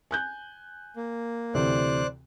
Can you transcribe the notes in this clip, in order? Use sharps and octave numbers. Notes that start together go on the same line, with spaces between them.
G#5 F#6 G6
A#3
D2 C3 E3 C5 D5 F#6